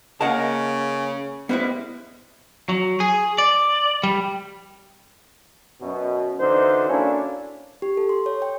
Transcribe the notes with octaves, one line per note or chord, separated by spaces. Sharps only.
C#3 A#3 A#4 D#5 F5 F#5 A5
G3 G#3 B3 E4 B4 C5
F#3
G#4
D5
G3
F#2 B2
F#2 D3 E3 D#4 C5
A#3 C#4 D4 E4 F#4 A4
G4
A4
C6
C#5
G5